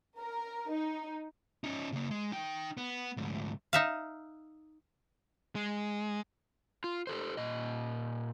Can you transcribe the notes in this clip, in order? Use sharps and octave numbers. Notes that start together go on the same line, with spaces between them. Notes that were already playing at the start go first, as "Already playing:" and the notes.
A#4
D#4
C#4 D#4
C#3 A#3
G#3
D#4 G5
B3
D2 G#2
D#4 E5 F5
G#3
F4
G4 A4 C5
A#2 D#5